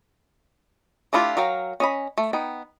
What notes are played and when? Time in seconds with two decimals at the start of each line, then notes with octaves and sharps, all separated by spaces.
1.13 A3 D4 E4 F4 G4
1.37 F#3 A#4 F5 G5
1.80 C#4 D#5 B5
2.18 A3
2.33 B3 D#4 G5